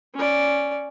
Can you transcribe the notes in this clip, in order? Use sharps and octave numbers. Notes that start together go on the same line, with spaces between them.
C#4 D5